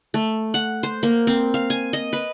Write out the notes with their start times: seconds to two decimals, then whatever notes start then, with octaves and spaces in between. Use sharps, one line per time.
0.14 A3
0.54 F#5
0.83 C5
1.03 A#3
1.27 C4
1.54 F5
1.70 G#5
1.93 D#5
2.13 B4